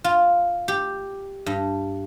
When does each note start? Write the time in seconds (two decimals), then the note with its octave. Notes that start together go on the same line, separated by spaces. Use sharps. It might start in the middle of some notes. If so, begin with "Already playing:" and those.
0.04 F4
0.68 G4
1.46 G2